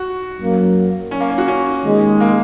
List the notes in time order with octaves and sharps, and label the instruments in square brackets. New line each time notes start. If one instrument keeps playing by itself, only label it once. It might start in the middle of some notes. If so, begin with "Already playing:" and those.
Already playing: [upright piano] F#4
[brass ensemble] F#2 F#3 A#3
[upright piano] C#4
A#3
C#4
F#4
C#4
[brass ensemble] D#2 D#3 G#3
[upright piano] A#3